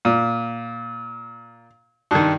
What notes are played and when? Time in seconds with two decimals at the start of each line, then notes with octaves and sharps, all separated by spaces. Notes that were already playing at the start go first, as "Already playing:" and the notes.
0.05 A#2
2.11 G2 D#3